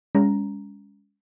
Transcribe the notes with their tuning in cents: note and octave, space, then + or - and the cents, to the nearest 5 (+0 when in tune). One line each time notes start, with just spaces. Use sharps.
G#3 -35 C#4 +25 A#5 +0